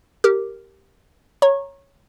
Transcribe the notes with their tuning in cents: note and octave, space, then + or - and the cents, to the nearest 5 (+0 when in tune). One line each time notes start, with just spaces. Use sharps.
G4 -5 A#4 -5
C#5 +0 A#5 +0 C#6 -25